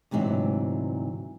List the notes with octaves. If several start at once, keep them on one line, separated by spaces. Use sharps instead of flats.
D2 G#2 C3 D#3 E3 F#3